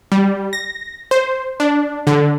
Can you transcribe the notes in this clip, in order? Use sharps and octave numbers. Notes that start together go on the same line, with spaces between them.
G3
A#6
C5
D4
D3